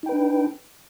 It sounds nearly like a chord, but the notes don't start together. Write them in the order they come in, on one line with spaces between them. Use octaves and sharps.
D#4 G5 B4 D4